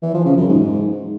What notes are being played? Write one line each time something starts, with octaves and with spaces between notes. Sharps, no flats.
E3
F3
C#3
F#2
G#2